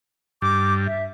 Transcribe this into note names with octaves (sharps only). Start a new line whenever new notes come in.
G2 D6
E5